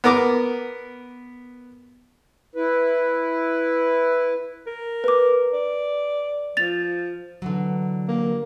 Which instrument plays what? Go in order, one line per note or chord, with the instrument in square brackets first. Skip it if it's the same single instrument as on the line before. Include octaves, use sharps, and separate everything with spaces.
[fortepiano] B3 A#4 D6
[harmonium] E4 B4
[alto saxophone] A#4
[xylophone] B4 D6
[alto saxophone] D5
[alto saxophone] F3 [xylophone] A6 F7
[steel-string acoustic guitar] D3 E3 F#3
[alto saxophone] A#3